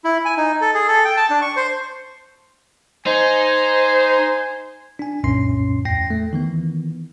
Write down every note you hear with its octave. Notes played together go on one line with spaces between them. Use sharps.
E4
G#5
D#4
A4
G#4
A4
G5
A5
D4
C#6
C5
D#4 C5 G#5
D4 G#5
C2 F#2 A#2 C#4 C6 C7
E2 A2 G5 A#6 C7
A3
D#3 E3 B3